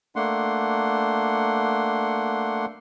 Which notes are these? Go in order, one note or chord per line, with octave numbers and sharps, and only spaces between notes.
A3 A#3 D4 F#5 C6